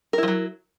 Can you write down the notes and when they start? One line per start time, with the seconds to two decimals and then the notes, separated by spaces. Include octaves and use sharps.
0.13 A#4
0.18 E4
0.23 F3
0.28 F#3